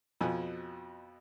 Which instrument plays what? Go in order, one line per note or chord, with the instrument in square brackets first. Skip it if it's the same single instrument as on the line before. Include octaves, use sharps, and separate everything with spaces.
[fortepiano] F2 B2 F3 G#5